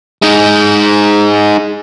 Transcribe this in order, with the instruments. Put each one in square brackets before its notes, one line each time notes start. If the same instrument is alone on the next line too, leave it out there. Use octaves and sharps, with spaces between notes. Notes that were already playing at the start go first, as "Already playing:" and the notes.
[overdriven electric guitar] G#3 D#4